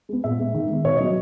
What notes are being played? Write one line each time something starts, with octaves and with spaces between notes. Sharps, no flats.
G#3 B3
A#2 E5
G#3 B3
D#3
G#3 B3
B2 C#5
F#3 B3 D#5